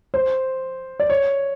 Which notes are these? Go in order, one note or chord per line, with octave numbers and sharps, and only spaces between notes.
C5
D5
C#5